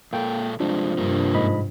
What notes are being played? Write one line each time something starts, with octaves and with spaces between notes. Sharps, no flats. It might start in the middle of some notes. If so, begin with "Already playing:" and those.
A#2 A#3 A4 G5
G2 C3 F3 G#3 D4
G2 C3 G3 A#3
G#2 D#5 B5